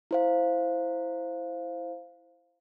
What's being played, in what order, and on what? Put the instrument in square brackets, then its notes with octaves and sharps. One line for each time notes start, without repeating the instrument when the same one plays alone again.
[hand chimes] E4 C5 F5